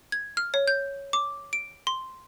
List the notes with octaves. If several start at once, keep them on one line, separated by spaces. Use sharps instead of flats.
G#6
F6
C#5
G6
D6
D7
C6